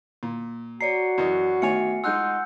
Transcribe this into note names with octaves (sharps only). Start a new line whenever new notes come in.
A#2
F#4 C#5 D5 A#5 C7 C#7
F#2 E3 D#5
D#3 A3 B3 C#5 E5 G#5 C#7
G#3 D#4 F4 F#5 G#5 E6 F#6 G6